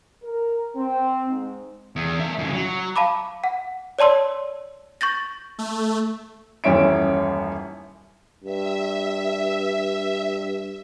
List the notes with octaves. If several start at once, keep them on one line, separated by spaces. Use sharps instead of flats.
A#4
C4
G#2
E2
A#3 E5
F2 C#3
F#3
F5 A5 B5 D6
F#5
C#5 D5 A5 C6 E6
C#6 G6 A6 A#6
A3
D#1 A1 F#2 C#4 E5 D7
G2 E5